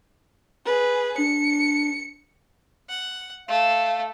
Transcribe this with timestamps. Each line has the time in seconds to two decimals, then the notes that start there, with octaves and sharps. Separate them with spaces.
0.66 G#4 B4
1.18 D4 C#7
2.89 F#5
3.48 A3 F5